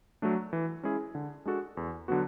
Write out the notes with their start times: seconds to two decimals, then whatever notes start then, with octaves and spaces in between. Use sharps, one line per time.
0.22 F#3 A3 D4
0.53 E3
0.83 G#3 C#4 E4 G#4
1.15 D3
1.45 G#3 D4 F#4 A4
1.77 E2
2.08 D3 F#3 B3 F#4